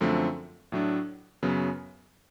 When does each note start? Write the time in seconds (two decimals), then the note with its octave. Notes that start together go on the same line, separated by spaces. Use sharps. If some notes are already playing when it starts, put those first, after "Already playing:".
0.01 F#2 D3 F3 A3 C4
0.72 A2 F#3 A3 D4
1.43 F#2 C#3 F#3 B3